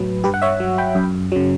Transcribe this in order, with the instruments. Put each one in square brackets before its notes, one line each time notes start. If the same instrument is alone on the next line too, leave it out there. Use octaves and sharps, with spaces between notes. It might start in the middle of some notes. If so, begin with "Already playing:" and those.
Already playing: [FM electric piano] A2 F#3 B4
G2 G4 B4
F#5
C#5 E5
F#3
G5 B5
F#2
C#3 F#3